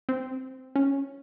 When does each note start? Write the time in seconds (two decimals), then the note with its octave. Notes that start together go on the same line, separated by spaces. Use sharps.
0.09 C4
0.76 C#4